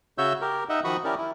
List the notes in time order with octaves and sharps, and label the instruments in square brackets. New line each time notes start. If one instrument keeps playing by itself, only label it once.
[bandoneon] C#3 F#4 C#5 E5 E6 G6
G4 A#4
D#4 D#5 E5 F#5
D#3 F3 F#4 B5 C#6 D#6
C#4 E4 G4 A#4 D5
E4